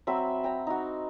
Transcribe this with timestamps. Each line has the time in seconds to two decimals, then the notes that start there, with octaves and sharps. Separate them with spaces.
0.07 F#3 C4 E5 B5
0.44 G5 A#5
0.67 D#4 F#4